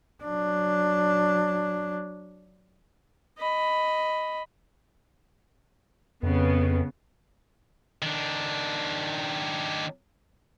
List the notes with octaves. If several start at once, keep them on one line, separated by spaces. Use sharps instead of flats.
F#3 D4
D#5 B5
F2 C#3 B3
D#3 D4